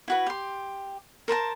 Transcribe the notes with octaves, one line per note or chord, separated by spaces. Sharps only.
E4 F#4 B4
G4 C6
A#4 C5 A5 A#5